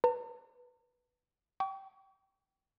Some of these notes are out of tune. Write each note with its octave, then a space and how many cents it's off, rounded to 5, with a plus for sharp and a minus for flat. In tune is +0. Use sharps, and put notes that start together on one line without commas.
B4 +0 A#5 -40
G5 -10 C#6 +45